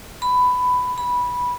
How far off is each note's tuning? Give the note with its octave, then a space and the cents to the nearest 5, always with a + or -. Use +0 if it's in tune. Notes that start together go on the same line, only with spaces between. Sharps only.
B5 +15
B5 -10